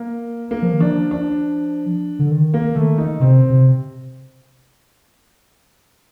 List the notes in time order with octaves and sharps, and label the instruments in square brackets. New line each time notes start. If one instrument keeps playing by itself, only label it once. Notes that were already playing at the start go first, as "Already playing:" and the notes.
Already playing: [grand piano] A#3
A#3
[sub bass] F3
D#3
[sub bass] F3 [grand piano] D4
[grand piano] D4
[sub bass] D3
D#3
[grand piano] A#3
[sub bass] D#3 [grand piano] A3
[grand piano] D#4
[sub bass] C3 [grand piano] C4
[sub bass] C3